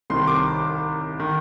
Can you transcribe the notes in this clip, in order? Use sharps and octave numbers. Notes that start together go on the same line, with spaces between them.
C2 C3 D#3 C6
D6
D#3